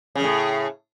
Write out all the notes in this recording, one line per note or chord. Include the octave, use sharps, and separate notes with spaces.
F#2 A2 C#3